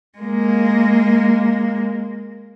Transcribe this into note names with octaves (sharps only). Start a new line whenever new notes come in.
G#3 A#3